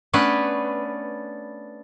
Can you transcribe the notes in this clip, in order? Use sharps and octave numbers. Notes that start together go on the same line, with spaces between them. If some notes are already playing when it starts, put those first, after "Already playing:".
A3 B3 C#4 D4 B4